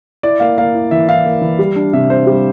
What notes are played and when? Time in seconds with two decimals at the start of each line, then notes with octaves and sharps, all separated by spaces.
0.23 E4 D5
0.40 A#3 F5
0.58 A#3 F5
0.74 E4
0.91 E3 E5
1.08 E4 F5
1.25 A#3
1.41 E3
1.59 G3
1.76 D4
1.93 C3 E5
2.10 D4 C5
2.26 G3